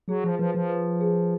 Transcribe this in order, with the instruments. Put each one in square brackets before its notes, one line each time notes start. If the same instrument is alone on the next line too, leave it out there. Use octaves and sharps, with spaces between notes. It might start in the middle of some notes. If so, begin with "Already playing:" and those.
[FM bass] F#3 [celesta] G#4
[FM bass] F3
[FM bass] F3 [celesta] B4
[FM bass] F3
[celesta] B4
G#4